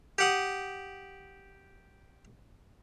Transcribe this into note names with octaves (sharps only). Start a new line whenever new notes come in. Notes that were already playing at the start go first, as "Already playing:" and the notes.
G4 F#5 D#6